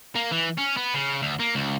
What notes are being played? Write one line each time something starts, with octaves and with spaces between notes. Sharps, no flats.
A#3
E3
C#4
B3
C#3
D2
A#3
C#2